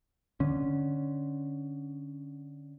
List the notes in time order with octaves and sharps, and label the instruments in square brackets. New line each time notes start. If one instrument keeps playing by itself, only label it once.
[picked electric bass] D3 C#4